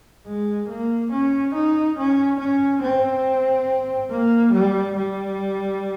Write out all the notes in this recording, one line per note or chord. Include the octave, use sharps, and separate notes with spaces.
G#3
A#3
C#4
D#4
C#4
C#4
C4
A#3
G3
G3